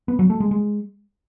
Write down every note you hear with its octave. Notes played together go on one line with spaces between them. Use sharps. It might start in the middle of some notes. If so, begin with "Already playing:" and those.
B3
F#3
A3
G#3
G#3